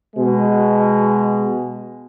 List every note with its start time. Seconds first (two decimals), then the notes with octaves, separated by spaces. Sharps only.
0.16 B2 G#3